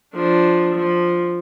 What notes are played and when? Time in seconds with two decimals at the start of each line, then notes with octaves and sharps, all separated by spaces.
0.15 F3 D4
0.75 F3